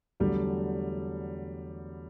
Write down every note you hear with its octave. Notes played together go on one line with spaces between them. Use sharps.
E2 D3 F#3 G3 A3